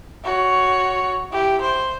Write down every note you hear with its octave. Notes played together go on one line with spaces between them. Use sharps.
F#4 C#5
E4 G4
C5